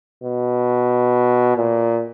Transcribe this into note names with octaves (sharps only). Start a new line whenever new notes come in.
B2
A#2